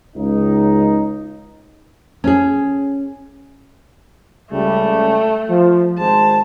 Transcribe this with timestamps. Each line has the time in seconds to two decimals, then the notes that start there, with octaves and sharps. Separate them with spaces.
0.16 C#2 D#4
2.24 C#4 G#4
4.51 C#2 C#3 G3 A3
5.49 F3
5.98 G#1 G#3 C5 A5